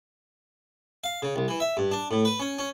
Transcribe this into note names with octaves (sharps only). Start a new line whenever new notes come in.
F5
C#3
C2
E3
E5
G2
D4
A2
B4
C#4
C#4